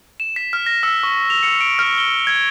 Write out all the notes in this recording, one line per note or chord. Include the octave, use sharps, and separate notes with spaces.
E7
B6
F6
A#6
E6
C#6
F7
C#7
D7
F6
G7
G#6